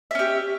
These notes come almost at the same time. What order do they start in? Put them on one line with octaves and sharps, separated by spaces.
E5 C#4 G4